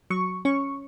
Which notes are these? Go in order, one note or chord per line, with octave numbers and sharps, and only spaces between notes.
F#3 C#6
C#4 C#6